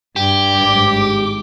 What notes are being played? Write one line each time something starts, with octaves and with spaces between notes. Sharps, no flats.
G2 G4
G#1 D6